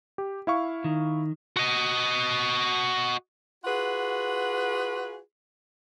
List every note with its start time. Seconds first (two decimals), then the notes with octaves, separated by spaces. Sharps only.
0.18 G4
0.47 E4 F5 C#6
0.84 D#3
1.57 F#4 D#5
3.63 F4 F#4 G#4 B4 F#5